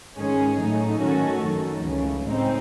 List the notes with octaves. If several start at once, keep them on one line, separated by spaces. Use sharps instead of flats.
G#2 D#3 G#3 C#4 G#4
A2 F#3 A3 D#4
D#3 F#3 C#4 F#4 A4
F#2 D#3 F#3 A3
C#2 C#3 E3
A2 G#3 C4 D#4